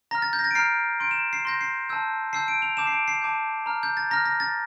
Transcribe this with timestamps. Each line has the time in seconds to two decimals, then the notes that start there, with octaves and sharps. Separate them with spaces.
0.11 A#5 F6 A#6
0.22 A6
0.33 G6
0.39 A#6
0.44 A6
0.51 D7
0.55 A#5 F6 C7
1.00 C6 G6 D7
1.11 E7
1.33 C7
1.45 C6 G6 A#6
1.61 C7
1.89 A5 E6 G6
2.33 A5 E6 G6 C7
2.48 D7
2.62 F7
2.77 A5 D6 G6 E7
2.87 C7
2.92 D7
3.08 C7
3.22 A5 D6 G6
3.66 A#5 F6
3.83 G6
3.97 A6
4.10 A#5 F6 A#6
4.25 A#6
4.40 A6